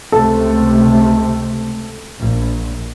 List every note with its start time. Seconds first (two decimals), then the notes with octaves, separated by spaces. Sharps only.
0.12 C#2 C3 A3 A4
2.20 A#1